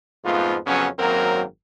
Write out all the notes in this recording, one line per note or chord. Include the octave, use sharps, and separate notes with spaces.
F2 G#2 F3 A3 B3 F4
F2 C#3 F#3 B3 C#4
G#1 F#2 F#3 A#3 C4 A#4